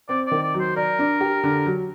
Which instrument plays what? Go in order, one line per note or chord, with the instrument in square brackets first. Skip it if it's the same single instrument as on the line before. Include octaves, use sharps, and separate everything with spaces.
[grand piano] C4 [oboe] D5
[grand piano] D#3 [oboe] D5
[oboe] D5
[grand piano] F#3
[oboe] C5
[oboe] A#4 [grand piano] D5
[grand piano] D4
G4
D3
F#3